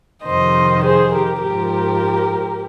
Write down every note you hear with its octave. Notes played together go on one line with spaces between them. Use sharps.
F2 C3 D#3 C5 D#5
G#4 C5
G4 A#4
G#2 F3 G4 A#4